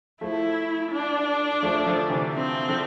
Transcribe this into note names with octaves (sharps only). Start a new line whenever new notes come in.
F3 A3 E4
D4
F3 A3
D3 F3
C3 E3
C4
D3 F3